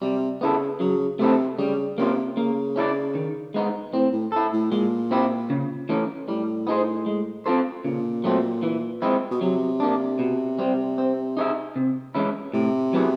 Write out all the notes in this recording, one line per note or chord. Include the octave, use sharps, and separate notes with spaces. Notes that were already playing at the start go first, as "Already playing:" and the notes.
C3 G3
C#3 B3 E4 A4
C#3 F#3
C3 A3 C4 E4 A4
C#3 G3
C3 A#3 C#4 F4
C#3 A#3
C#4 E4 A4 D5
D#3
G#3 B3 D#4
A2 C4
A2
E4 A4
A2
A#2 G#3
C4 E4 G4
C#3
E3 A3 C#4
A2 G3
B3 D#4 G#4 C5
G#3
C4 F4 A4 C5
A#2 C#3
F#3 A3 C4
E3
G#3 C4 E4
B2
C3 F#3
A#3 D4
B2
G3 C4
C4
D#4 G#4 C#5 E5
C3
E3 G#3 C#4 E4
A2 C3
F#3 B3 E4 G#4